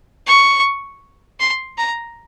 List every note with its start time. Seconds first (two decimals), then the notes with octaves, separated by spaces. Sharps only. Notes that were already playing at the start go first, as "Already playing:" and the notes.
0.27 C#6
1.40 C6
1.78 A#5